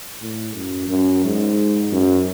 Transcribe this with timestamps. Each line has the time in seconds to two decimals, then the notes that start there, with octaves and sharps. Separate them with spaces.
0.21 A2
0.55 F#2
0.89 F#2
1.24 G#2
1.92 F#2